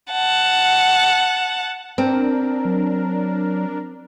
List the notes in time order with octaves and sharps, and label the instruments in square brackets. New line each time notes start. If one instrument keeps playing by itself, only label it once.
[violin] F#5 A5
[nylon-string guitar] C4 [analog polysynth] D4 A#4
[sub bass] F#3